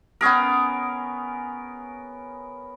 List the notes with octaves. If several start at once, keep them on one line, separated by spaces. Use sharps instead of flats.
B3 C#4 G#4 A#4